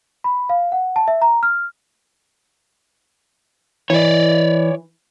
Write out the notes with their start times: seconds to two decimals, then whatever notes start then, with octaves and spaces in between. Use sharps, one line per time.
0.24 B5
0.49 F5
0.72 F#5
0.96 A5
1.08 E5
1.22 A#5
1.43 F6
3.90 E3 C#5 D5